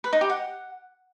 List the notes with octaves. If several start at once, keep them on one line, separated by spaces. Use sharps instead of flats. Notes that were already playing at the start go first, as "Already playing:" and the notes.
B4
D#4
G4
F#5